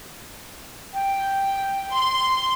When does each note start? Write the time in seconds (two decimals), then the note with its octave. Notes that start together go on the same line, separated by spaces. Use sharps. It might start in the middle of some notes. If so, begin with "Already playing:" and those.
0.94 G5
1.94 C6